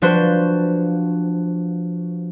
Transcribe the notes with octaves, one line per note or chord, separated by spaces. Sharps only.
F3 D4 F#4 B4 C5